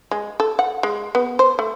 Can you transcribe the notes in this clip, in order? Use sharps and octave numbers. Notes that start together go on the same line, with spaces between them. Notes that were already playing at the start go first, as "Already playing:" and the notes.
G#3
A4
F#5
G#3
B3
C5
A3